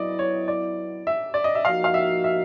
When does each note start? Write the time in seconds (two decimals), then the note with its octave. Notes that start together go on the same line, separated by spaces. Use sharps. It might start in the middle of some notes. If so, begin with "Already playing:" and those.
Already playing: F#3 B3 E4 D5 D#5
0.19 C#5
0.48 D5
1.07 E5
1.34 D5
1.44 D#5
1.55 E5
1.65 F3 A#3 D#4 F#4 F5
1.84 F5
1.94 E5
2.24 E5